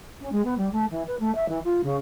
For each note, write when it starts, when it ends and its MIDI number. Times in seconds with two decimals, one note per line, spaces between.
0.20 0.29 61
0.32 0.41 56
0.44 0.57 59
0.57 0.69 55
0.72 0.85 57
0.90 1.03 52
1.07 1.15 71
1.19 1.33 57
1.35 1.47 76
1.48 1.59 52
1.64 1.81 65
1.83 1.97 49